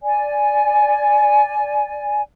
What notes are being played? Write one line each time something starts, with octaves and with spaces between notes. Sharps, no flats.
D5 G#5